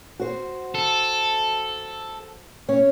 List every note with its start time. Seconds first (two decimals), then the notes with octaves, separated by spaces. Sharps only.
0.20 F#4 C5
0.75 A4
2.69 C#4 C#5